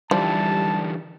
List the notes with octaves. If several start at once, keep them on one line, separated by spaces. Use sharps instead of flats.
D3 E3 F3 G3 A5